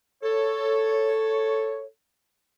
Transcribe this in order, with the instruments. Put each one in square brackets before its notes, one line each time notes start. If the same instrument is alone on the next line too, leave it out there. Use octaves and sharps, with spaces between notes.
[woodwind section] A4 C#5